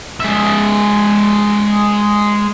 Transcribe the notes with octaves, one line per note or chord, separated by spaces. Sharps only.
G#3 E5